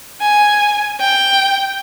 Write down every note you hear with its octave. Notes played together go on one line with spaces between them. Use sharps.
G#5
G5